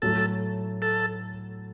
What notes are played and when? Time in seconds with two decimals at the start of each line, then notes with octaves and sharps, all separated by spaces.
0.02 A2 F#3 A3 A4
0.82 A4